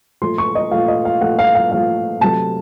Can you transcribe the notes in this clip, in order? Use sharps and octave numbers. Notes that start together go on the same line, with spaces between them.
A#2 F3 A3 C6
C#6
D#5
A#2 F3 A3 F5
D#5
F5
A#2 F3 A3 F#5
F5
F5
A#2 F3 A3 F5
C3 F#3 A3 A5